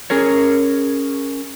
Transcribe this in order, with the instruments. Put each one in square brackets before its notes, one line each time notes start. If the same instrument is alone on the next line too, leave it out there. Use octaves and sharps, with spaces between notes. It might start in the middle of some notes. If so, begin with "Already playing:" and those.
[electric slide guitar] C#4 G#4 A#4 C#5